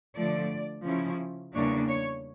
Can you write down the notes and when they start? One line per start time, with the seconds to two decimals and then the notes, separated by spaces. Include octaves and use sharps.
0.16 D3 F3 A3 D5
0.85 C#3 F3 C#4 E4
1.54 E2 C#3 G3 A#3 D4 C#5
1.88 C#5